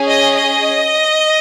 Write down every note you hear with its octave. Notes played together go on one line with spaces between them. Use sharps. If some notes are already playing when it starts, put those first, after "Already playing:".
Already playing: C#4 G#4
D#5
D#5